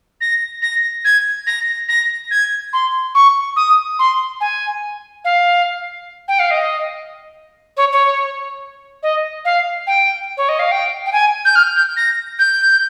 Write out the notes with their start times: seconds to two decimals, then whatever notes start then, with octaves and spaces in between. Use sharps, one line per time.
0.21 A#6
0.62 A#6
1.05 G#6
1.47 A#6
1.89 A#6
2.31 G#6
2.73 C6
3.15 C#6
3.56 D#6
3.99 C6
4.41 G#5
5.25 F5
6.28 G5
6.39 F5
6.51 D#5
7.77 C#5
7.92 C#5
9.03 D#5
9.45 F5
9.87 G5
10.37 C#5
10.49 D#5
10.59 F5
10.72 G5
11.06 G5
11.13 G#5
11.45 G6
11.56 F6
11.76 G6
11.97 A#6
12.39 G6